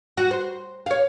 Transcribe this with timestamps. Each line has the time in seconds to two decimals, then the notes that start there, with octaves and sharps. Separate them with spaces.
0.17 F#4
0.31 C5
0.86 C#5 F5